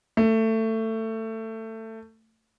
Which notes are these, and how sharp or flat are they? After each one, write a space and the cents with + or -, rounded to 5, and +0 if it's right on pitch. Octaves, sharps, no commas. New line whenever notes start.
A3 +20